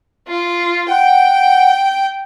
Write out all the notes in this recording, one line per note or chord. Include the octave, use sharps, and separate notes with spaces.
F4
F#5 G5